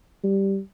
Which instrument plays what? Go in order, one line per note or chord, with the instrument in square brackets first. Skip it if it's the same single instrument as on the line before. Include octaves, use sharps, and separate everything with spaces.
[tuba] G3